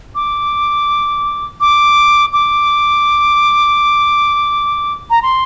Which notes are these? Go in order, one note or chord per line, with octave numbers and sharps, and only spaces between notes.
D6
D6
D6
A#5
C6